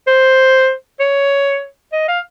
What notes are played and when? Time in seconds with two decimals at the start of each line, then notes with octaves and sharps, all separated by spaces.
0.07 C5
1.00 C#5
1.92 D#5
2.08 F5